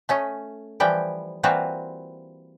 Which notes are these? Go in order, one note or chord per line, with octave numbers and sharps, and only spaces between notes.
A3 C#4 D#5
E3 F3 G3 G5
E3 G3 A#3 C4 F4 F#4